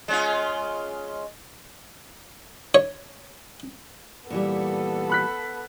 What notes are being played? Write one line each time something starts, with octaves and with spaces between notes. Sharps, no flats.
G#3 C#4 F4
C#5
A#2 E3 G3 B3 A4
B5 F#6 B6